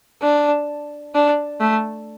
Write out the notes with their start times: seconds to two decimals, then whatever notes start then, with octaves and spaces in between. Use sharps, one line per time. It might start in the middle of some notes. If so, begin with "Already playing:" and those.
0.22 D4
1.15 D4
1.60 A3